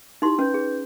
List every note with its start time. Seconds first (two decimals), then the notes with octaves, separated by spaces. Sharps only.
0.22 D#4 E4 G4 C6
0.39 C#4 B4 G6
0.54 G#4